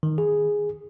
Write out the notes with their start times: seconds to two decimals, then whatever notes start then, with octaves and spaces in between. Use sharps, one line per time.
0.03 D#3
0.18 G#4